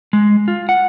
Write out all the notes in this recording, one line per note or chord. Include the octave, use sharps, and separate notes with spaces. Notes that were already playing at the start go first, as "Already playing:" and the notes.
G#3
F4
F#5